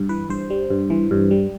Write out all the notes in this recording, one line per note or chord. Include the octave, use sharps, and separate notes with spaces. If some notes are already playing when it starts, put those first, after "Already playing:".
Already playing: G2
E3 B4
G2 C5
G3
G2
E3
G2
G3